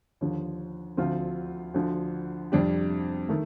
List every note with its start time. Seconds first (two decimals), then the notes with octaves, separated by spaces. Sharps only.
0.21 D#2 D3 F3
0.97 D2 D3 F3 C4 F4
1.74 D2 D3 F3
2.52 F2 C3 G3 D4 G4
3.29 D#3 A3